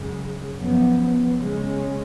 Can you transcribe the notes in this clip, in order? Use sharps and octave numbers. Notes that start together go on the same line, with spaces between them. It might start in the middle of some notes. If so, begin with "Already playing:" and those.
Already playing: F#2 C#3 G#3
F#2 F3 B3
C#3 G#3 C#4